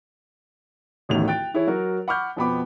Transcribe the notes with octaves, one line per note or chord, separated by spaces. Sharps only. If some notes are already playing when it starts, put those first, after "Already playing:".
D1 A1 E2 D#3 A3 F7
G5 F#6 A6 D7
E3 E4 G#4 C#5
F#3 F#4 A#4
F#5 B5 C#6 D6 F6 G6
F2 B2 B3 G5 B5 D6